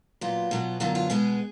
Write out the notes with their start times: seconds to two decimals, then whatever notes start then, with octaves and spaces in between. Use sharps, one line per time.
0.21 A#2 F#3 B3 F4
0.51 B2 F#3 B3
0.80 F#2 D3 F#3 B3 F4
0.95 F4
1.10 B2 G#3 B3 G#4